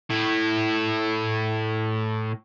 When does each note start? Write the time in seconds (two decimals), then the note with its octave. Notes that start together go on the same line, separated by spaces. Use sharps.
0.10 A2 E4